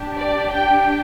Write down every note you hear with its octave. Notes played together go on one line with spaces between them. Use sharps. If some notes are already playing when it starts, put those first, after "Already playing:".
Already playing: D4 G4
D5
G5